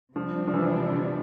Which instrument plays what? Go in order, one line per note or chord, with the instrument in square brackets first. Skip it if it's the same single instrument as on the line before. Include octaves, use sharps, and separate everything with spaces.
[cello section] C3 G3 D4 [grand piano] F3
[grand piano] F3
E3
D3